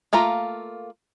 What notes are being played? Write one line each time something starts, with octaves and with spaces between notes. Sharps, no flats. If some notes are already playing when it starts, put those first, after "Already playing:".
A3 A#3 F4 A#5